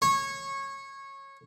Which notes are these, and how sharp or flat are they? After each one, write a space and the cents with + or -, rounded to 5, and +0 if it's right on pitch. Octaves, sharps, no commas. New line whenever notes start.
C#5 -20